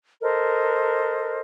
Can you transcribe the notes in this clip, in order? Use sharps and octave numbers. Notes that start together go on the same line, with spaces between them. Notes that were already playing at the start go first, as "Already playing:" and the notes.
A4 A#4 C5 D#5